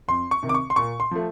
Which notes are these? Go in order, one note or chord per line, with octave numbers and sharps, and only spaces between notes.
F2 C6
C#6
C3 D#3
D6
C#6
C6
A#2 C#6
C6
F3 A3